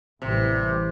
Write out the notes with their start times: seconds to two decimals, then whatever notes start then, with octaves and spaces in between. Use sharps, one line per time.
0.22 A1 C3 E3 G3